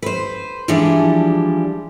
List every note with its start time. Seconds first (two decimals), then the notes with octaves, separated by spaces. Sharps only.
0.02 B4 C5
0.68 E3 F3 G3 G#3 D4